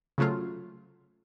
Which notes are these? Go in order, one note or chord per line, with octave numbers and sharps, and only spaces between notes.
C#3 F3 F#3 A3 F4